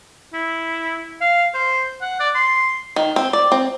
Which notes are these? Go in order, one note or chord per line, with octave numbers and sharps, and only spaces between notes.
E4
F5
C5
F#5
D5
C6
D#3
C4
D5
C4